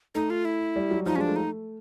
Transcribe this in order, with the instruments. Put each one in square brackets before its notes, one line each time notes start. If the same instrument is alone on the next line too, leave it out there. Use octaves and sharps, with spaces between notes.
[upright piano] A3 [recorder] D#4
[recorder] F4
E4
[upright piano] G3
F#3
[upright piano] F3 [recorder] D#4
[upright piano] G#3 [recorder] C#4
[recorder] D4
[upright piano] A3
[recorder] D#4